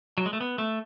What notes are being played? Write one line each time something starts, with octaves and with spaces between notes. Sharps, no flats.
F#3
G#3
A3
B3
A3